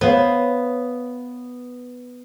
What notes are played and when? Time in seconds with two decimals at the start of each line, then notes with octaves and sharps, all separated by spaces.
0.01 B3 C5 C#5 F5